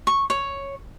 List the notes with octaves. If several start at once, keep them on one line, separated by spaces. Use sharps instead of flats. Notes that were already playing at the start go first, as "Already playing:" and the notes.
C#6
C#5